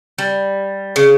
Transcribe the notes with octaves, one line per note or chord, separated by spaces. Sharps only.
G3
C#3